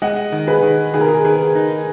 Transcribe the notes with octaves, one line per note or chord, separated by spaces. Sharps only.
G#3 D#5 F#5
D#3
G#4 B4
D#3
D#3 G#4
A#4
G#4
D#3 G#4
D#4